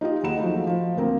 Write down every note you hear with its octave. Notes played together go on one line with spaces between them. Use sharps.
D#4 F4 G4 D#5
D#2 G#4 F#5 A#5 B5 E7
F3 F#3 A3 D#4
F3
D2 A#3 C4 A#5